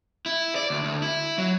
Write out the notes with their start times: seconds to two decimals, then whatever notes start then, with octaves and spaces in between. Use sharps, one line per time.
0.26 E4
0.56 D5
0.70 D2
0.84 D2
1.02 E4
1.38 F#3